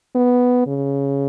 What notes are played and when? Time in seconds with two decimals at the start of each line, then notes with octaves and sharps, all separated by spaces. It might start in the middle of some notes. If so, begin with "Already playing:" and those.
0.15 B3
0.67 C#3